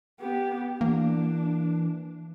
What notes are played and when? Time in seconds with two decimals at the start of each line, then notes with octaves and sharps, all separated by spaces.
0.20 B3 G4
0.81 E3 A#3 D4